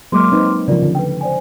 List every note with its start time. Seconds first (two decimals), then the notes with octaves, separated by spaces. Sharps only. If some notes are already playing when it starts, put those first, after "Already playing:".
0.12 F#3 G#3 A#3 C6 D6 F6
0.32 C4 D#4 B4
0.68 C#3 F3 F4 A#4 D5
0.83 D3
0.95 B4 G5
1.21 C5 D5 G#5